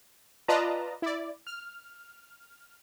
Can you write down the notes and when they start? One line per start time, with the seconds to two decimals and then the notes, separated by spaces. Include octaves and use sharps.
0.48 F4 B4 D5 D#5 A5 A#5
1.02 E4 D5
1.47 F6